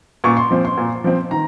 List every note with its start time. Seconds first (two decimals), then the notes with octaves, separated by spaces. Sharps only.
0.24 A#2 C#6
0.37 C6
0.51 F3 C4
0.65 C6
0.77 A#2
1.04 F3 C4
1.31 D#3 A#5